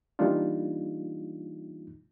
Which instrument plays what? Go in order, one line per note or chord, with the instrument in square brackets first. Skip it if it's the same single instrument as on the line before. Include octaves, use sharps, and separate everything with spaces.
[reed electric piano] E3 G3 A#3 D4 D#4 F4